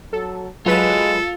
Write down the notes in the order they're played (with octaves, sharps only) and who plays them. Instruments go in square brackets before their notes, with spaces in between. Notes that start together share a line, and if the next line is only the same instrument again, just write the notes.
[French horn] F#3 [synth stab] A4
[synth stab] F#3 B4 E7 [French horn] G#3 [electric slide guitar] F4 [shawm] A4